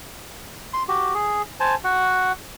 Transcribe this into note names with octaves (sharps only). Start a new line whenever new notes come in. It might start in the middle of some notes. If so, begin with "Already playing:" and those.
C6
F#4 G4
G#4
C5 G#5 A5
F#4 F#5